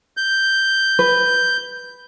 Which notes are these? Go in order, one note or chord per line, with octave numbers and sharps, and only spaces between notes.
G6
B4